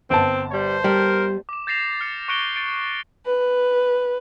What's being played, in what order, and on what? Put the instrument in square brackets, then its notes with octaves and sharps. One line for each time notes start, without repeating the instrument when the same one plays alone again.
[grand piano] G1 A5 [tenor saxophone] C4
[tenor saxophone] G3 [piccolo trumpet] C5
[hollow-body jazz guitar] G3 [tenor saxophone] A#4
[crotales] D6 E7
G6 A6 A#6 C7 E7 F7
F6 C#7
C#6 F#6 A#6 C#7 D7 G7
A6 D7
[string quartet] B4